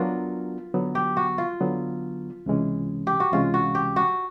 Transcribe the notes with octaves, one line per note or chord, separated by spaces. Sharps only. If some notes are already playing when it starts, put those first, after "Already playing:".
Already playing: F#3 B3 D4 F4 F#4 A#4
D3 F#3 B3
G4
F#4
F4
D3 F#3 B3
C#2 C3 E3 G#3 C#4
G4
F#4
C#2 C3 E3 G#3 C#4 F4
F#4
G4
F#4